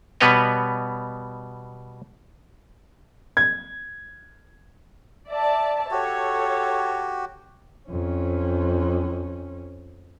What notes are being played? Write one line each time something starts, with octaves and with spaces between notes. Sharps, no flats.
B2 G3 B3 B4 C#5 D#5
G#6
D5 E5 A5
F#4 G4 A4 C#5
F2 C#4